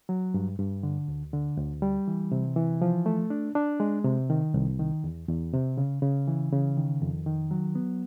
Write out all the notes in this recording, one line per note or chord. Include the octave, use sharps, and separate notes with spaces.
F#3
G2
G2
D3
D2
D3
D2
G3
E3
C3
E3
F3
A3
D4
D4
G#3
C3
D#3
C2
D#3
E2
E2
C3
C#3
C#3
E3
C#3
D#3
F2
D#3
F#3
B3